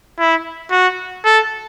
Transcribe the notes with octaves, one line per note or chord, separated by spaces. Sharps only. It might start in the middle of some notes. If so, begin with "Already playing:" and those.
E4
F#4
A4